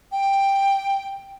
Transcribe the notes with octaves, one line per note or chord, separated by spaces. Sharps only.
G5